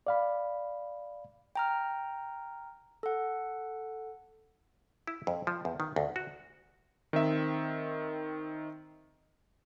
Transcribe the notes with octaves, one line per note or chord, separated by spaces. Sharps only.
D5 F5 B5
G5 A#5 F6
A4 F#5
E4
F2
F3
E2
D#3
D2
F#4
D#3 C4 E5